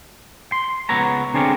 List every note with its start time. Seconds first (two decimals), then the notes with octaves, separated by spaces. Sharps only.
0.52 C6
0.89 C#2 B3 B4 C#5 A#5
1.34 D3 C4 D4 G#4 A#4 C#5